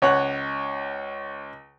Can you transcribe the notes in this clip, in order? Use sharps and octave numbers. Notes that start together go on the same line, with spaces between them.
C#2 C#5 F#5 F#6